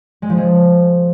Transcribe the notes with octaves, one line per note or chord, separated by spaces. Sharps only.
G#3
F3
G#3